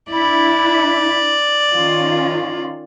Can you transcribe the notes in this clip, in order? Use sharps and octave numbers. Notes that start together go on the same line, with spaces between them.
D4 E4 D5
D#3 C#4 F4